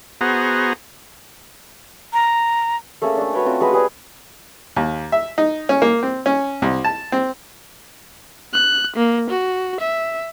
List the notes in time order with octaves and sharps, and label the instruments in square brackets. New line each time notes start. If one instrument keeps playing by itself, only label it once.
[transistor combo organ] B3 F#4 G#4 C5 A#5
[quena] A#5
[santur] A3 A#3 C#4 G#4
A3 D4
F#4 B4 C#5 G5
C4 C#4 F4 F#4
G#3 F#4 B4 E5
G4 G#4 B4 D5
[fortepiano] D#2
E5
D#4
C#4
A#3
C4
C#4
C2
A5
C4
[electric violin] F#6
A#3
F#4
E5